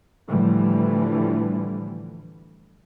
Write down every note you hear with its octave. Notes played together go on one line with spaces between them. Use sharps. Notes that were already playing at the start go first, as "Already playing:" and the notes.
A2 D3 E3 F3 G3 A3